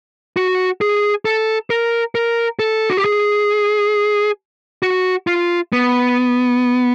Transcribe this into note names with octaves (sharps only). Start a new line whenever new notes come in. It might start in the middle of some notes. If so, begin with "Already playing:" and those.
F#4
G#4
A4
A#4
A#4
A4
F#4
G4
G#4
F#4
F4
B3